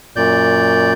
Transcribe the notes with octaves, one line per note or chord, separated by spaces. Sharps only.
F#2 A#2 D5 G6